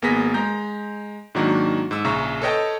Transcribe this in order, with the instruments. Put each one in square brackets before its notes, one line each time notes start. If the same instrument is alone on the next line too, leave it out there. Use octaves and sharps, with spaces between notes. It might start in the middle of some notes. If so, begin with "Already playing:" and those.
[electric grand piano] G#1 A#3 B3 G#4 A#6 B6
G#3 A#5 G6
G#2 D#3 F#3 A#3 D4 F#4
G#2 E6
A#1 C#3 E5 A#5 C#6
A4 B4 C#5 D#5 G5 A5